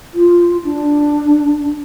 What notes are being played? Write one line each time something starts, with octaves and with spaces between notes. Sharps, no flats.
F4
D4